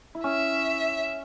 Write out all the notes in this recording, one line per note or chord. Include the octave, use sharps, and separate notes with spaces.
E4
C#4 E5